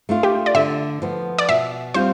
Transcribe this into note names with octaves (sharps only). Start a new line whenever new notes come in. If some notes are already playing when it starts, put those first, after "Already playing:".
A3 D4 F4
G4
D5
D3 E5
F3 B3
D5
B2 E5
G3 C4 F4 C5